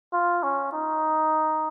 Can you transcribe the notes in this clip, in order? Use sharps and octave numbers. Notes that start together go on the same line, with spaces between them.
F4
C#4
D#4